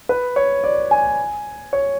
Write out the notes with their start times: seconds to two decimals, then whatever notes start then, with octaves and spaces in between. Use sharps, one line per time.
0.09 B4
0.36 C#5
0.64 D5
0.91 G#5
1.73 C#5